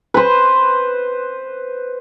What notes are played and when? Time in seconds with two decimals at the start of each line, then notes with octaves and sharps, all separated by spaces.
0.14 B4 C5